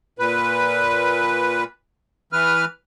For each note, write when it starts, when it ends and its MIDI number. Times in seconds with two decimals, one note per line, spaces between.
0.19 1.64 46
0.19 1.64 71
2.33 2.65 52
2.33 2.65 71
2.33 2.65 89